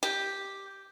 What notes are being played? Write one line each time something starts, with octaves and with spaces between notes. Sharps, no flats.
G4